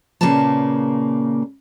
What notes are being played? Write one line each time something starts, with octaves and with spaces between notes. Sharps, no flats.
A#2 C#3 A#3 A#4 B4 A5